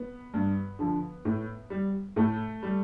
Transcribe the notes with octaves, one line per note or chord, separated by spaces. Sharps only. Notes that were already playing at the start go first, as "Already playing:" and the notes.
Already playing: B3
G2
D3 F3
A2
G3
A2 A3
G3